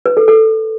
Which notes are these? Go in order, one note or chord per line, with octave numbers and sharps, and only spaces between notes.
B4
A4
A4